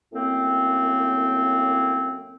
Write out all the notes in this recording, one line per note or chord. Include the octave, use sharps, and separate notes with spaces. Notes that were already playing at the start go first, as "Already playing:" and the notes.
F#2 A2 A#3 C4